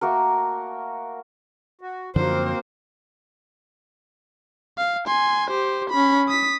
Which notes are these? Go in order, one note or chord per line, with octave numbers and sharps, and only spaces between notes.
A3 A#3 F#4 A#4
F#4
F#2 D3 F3 A#3 C4 F#4 A#4 C5
F5
G#5 C6
G4 C5
C#4 B5
D#6 B6